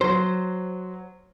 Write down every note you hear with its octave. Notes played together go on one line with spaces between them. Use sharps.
F#3 C5